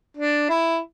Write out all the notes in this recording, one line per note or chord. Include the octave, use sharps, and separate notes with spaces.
D4
E4